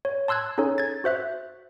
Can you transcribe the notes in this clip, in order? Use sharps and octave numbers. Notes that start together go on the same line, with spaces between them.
C#5
A5 C6 E6 F#6 G#6
C#4 D#4 G#4 A4 C#5
G#6 A6
F#4 C5 E5 F#6